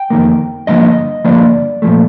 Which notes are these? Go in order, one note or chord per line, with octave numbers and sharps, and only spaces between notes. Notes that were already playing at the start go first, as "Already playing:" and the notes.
Already playing: G5
F2 D#3 A#3
G2 D3 F3 A#3 D#5
G2 D3 F3 A#3 D5
A#2 F3 A3